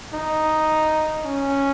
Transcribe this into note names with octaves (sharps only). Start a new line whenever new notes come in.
D#4
C#4